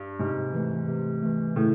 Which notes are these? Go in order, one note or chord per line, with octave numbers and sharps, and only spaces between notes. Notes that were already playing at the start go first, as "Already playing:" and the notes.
Already playing: G2
G#2 C3
E3 A3
C3
E3 A3
A2 C#3